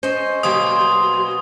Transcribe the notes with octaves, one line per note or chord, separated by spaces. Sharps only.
C#4 C5 D#5
B2 F#3 A#3 G4 C6 D#6